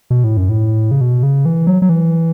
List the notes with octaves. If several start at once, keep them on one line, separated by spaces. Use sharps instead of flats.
B2
A2
F#2
A2
C#3
B2
C#3
E3
F#3
F#3
E3